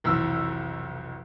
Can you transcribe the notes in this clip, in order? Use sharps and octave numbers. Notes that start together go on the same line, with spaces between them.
F1 B1 E3 E6